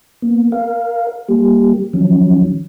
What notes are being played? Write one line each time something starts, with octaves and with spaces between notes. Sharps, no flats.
A#3 B3
A#4 F5
G3 A#3 G4
D#3 F3 F#3 C#4